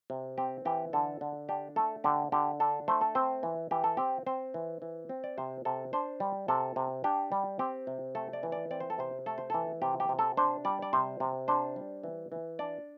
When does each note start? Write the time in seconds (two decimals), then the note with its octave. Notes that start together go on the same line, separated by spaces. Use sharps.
0.10 C3
0.38 C4 G4
0.65 E3 G4
0.93 D3 A4
1.21 D3
1.49 D4 G4
1.76 A3 A4
2.04 D3 G4
2.32 D3 G4
2.60 D4 A4
2.88 A3 C5
3.01 A4
3.15 C4 C5
3.43 E3
3.71 E3 G4
3.84 A4
3.97 C4 G4
4.26 C4 C5
4.54 E3
4.82 E3
5.09 C4
5.24 D5
5.38 C3 C5
5.65 C3 A4
5.93 D4 C5
6.20 G3
6.48 C3 A4
6.76 C3
7.04 D4 G4
7.32 G3
7.59 C4 G4
7.87 C3
8.15 A3 A4
8.33 D5
8.43 E3
8.52 D5
8.71 C4 D5
8.80 C5
8.90 A4
8.98 C3 C5
9.26 A3 A4
9.38 C5
9.50 E3 A4
9.82 C3 G4
10.00 G4
10.09 C3
10.19 A4
10.37 D4 C5
10.65 G3 D5
10.82 D5
10.93 C3 C5
11.20 C3
11.48 D4 C5
11.76 G3
12.04 E3
12.32 E3
12.59 D4 D5